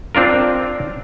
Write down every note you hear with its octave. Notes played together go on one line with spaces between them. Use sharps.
C4 D4 F4 A#4